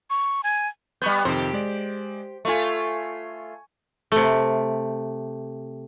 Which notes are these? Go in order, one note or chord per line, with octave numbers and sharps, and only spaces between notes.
C#6
G#5
G3 B3 B5 C#6 G6
F2 C3 D#3 G4 C5
G#3 D5
A3 F4 G#5 C#6
C3 A3